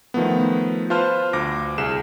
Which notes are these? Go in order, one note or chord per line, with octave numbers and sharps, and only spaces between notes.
D#3 F3 A3 B3
F4 B4 C5 A5 F6
D2 D6 A#6
C2 G#4 E7